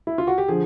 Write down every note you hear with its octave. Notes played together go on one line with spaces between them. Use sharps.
E4
F4
F#4
G4
D3 F3 G#4